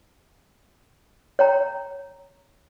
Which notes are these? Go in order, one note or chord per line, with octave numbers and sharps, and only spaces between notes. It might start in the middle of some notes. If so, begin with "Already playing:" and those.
C#5 G5 A#5